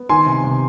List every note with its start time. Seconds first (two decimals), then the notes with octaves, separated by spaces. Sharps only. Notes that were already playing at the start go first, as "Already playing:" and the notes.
Already playing: B3
0.09 D#3 G#5 C6
0.26 C3
0.44 C3